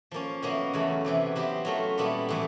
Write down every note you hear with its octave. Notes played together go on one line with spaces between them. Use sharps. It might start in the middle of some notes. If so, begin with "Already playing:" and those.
F3 A#3 C#4
B2 F#3 A#3 C#4 E4
E2 C#3 F#3 A3
E2 C3 E3
F#3 B3 E4 G4 C5
F#3 A3 C#4 F4 A#4
A#2 G3 B3 E4 A4
A2 E3 A3